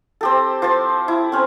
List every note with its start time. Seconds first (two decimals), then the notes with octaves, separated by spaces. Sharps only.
0.21 C4 G4 A4
0.62 F3 C5 A5
1.08 E4
1.32 C4 C#4